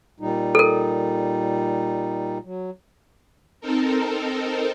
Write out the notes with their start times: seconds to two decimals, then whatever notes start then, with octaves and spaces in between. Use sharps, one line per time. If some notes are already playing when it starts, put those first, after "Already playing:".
0.20 A#2 G3 D#4
0.55 A4 A#4
2.44 F#3
3.61 C4 D#4 A4 A#4